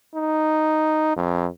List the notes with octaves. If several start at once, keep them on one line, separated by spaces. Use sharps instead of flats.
D#4
F2